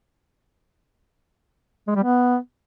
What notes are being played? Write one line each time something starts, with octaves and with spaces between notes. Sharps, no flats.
G#3
G3
B3